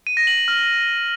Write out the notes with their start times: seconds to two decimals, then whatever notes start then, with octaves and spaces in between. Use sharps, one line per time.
0.07 D#7
0.17 A#6
0.27 F#7
0.38 F#7
0.48 F6